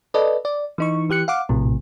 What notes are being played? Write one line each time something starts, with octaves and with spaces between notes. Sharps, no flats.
A4 B4 D5 D#5
D5
E3 D#4 C#6
E3 G4 F#6 C#7
F5 F#5 D6
A#1 A2 C3